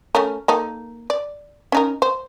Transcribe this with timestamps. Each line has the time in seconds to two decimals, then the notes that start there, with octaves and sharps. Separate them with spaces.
0.15 A3 C#4 A#4
0.48 A#3 D#4 A4
1.10 D5
1.72 C#4 D#4 A#4
2.02 C5